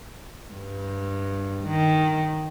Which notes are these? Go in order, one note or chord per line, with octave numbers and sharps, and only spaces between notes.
G2
D#3